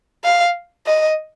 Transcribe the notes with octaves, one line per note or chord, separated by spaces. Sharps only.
F5
D#5